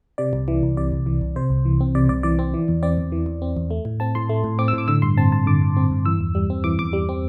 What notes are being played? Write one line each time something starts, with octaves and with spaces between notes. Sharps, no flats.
C3 D5
C2
E3
C2
C3 D5
C2
E3
C2
C3 C5
C2
E3
C4
C3 D5
C2 D5
E3 D5
C4
E3
E2
C4 D5
E2
E3
E2
C4
E2
A3
A2
C4 A5
A2 C6
A3
A2
C4 D6
E6
A2 D6
D3 E6
G2 C6
C4 A5
G2 A5
D3 D6
G2
C4
G2
E3 E6
E2
G3
C4
E3 D6
E2 D6
G3
C4